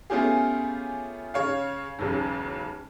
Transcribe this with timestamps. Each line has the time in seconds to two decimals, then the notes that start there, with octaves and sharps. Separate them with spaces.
0.10 A3 B3 C#4 F4 G4 G#4
1.34 C#3 C#5 F5
1.99 E1 B1 C#3